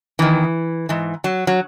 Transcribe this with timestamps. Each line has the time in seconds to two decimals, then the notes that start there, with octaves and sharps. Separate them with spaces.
0.19 E2 D#3 E3
0.89 G#2 E3
1.24 F#3
1.47 F#3